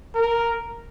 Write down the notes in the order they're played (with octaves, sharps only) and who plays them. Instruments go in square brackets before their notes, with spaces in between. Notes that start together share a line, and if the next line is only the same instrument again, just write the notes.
[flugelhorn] A#4